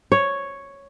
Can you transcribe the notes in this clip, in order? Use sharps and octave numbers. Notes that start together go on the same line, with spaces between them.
C#5